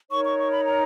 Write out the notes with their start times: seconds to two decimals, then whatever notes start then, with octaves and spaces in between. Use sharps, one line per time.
0.11 D#4 A#4 C#5 C#6
0.24 C#6
0.37 C#6
0.50 B5
0.64 A#5